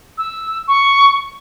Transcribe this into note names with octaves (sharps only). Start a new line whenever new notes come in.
E6
C#6